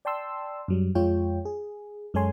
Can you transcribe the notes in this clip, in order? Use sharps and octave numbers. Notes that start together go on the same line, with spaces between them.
D5 G5 A5 C6 E6
F#2 F#3 G3
F2 G#3 F4 C#5 G5
G#4
F#2 G#3 A4 C#5 G#5 C6